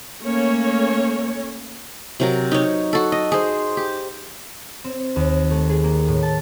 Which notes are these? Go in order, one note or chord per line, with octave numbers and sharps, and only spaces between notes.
A3 A#3 C#4 C#5
C3 F#3 A#4
D#4 C#5
F#4 A4
D#5
G#4 C5
G4
C4
D#2
A3
G#4
A#3
A2
A5